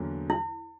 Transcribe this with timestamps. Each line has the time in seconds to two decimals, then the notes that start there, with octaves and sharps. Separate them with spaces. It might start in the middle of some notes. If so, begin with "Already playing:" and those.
Already playing: E2 D3 F#3 A#3
0.30 E4